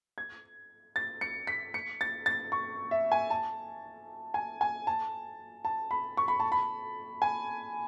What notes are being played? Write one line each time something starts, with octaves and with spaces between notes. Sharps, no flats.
G#6
A6
C#7
B6
C#7
A6
A6
C#6
E5
G#5
A5
G#5
G#5
A5
A5
B5
C#6
B5
A5
B5
G#5